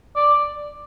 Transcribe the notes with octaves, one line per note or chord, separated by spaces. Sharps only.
D5